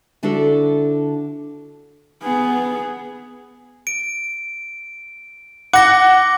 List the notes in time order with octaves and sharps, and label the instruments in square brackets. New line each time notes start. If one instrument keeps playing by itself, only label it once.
[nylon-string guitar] D3 D4 E4 F#4 A4
[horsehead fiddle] B3 G#4
[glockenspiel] D7
[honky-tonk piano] F#5 [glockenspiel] D6 A#6 G7